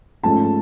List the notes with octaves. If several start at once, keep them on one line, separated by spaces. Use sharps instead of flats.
G#2 F3 A3 C#4 A5